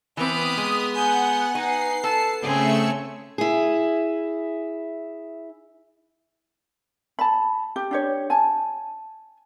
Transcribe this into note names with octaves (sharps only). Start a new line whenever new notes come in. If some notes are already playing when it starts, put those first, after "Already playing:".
E3 B3 C4 B5 D6 D#6 F6
G#3
F#5 G#5 G6
D#4 B4 G#5 C7
A4 A5
C#3 A3 C4 C#4 G#4 E6 C#7
E4 G#4
A5 B5
G4
D4 G4 C#5
G#5 A5